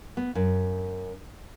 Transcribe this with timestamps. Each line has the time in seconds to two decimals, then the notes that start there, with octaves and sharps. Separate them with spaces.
0.17 B3
0.35 F#2